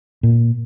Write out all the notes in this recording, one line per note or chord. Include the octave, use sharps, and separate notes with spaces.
A#2